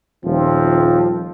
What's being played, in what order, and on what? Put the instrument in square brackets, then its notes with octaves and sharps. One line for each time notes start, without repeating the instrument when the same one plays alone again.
[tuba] D#1 [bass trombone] F3 [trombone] C4